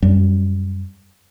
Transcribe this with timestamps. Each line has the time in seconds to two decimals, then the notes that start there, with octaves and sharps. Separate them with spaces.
0.02 F#2 G3